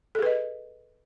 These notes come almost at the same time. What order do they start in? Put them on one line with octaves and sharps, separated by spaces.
A4 G#4 B4 D#5